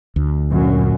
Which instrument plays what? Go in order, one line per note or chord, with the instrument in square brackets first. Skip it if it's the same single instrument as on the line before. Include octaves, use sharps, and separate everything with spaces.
[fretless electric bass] D2
[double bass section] F#2 A#2